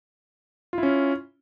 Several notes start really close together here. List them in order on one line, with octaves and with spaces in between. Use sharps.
F4 E4 C#4